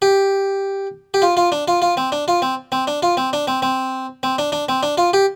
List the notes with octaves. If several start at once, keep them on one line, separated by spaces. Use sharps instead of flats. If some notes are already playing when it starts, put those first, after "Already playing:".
G4
G4
F4
F4
D4
F4
F4
C4
D4
F4
C4
C4
D4
F4
C4
D4
C4
C4
C4
D4
D4
C4
D4
F4
G4